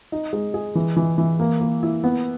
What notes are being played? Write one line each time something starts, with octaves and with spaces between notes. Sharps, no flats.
D#4
G#3
G#4
E3
E3
E3
A#3
A#3
E4
B3